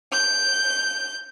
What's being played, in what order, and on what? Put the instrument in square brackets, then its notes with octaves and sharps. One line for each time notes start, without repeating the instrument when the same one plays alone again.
[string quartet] G6